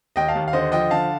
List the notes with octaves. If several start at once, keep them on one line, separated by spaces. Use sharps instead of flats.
D#2 D#5 G5
F5 A5
D#2
F5
D3 C5 D#5
F3 D#5 G5
D3 F5 A5